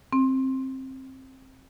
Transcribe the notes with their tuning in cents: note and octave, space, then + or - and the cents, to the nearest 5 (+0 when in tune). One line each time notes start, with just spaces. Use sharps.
C4 +15